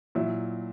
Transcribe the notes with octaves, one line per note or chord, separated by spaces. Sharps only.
A#2 F#3 E4